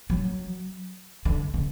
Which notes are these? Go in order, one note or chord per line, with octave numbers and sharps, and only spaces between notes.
F#3
D3
C#3